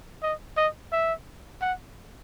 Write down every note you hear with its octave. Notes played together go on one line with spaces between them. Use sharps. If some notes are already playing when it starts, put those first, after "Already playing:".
D#5
D#5
E5
F#5